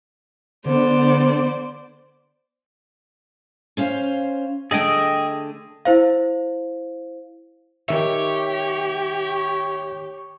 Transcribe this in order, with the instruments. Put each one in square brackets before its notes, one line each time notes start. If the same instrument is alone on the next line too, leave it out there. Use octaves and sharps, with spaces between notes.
[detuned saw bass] D3 [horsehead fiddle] B3 D5 [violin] C5
[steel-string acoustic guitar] C#4 C5 F5
[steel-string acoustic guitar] D3 A3 [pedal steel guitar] G#4 D#5 G5
[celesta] E4 C5 F5
[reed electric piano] D#3 E5 [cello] G4 [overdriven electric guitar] C#5